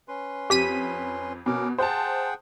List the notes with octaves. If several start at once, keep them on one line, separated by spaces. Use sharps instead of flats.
C#4 B4 C6
F2 G4 B6 D#7
B2 C#4 A#4 D6
G#4 C5 F#5 G5 A5